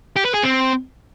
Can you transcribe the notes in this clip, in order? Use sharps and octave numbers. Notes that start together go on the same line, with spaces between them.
G4
B4
G#4
C4